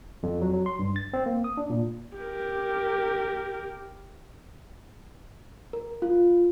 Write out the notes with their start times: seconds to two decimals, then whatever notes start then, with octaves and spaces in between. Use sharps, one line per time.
0.23 F2
0.41 F#3
0.53 F#3
0.66 C6
0.79 G2
0.96 A6
1.13 C4
1.26 A#3
1.44 D#6
1.57 D4
1.70 A#2
2.18 G4 A#4
5.73 A#4
6.02 F4